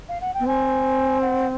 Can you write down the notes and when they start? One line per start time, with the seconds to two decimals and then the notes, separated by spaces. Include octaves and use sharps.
0.09 F5
0.21 F#5
0.34 G5
0.40 B3
0.46 C4 G#5
1.21 F#5